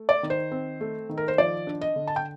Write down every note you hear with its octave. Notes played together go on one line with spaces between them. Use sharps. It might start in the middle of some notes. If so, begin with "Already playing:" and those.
Already playing: A3
D5
D#3
C5
C4
A3
D#3
A#4
C5
F3 D5
D4
D#5
D3
A5
G5